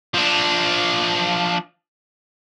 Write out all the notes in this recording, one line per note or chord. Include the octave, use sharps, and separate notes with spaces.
F3 D4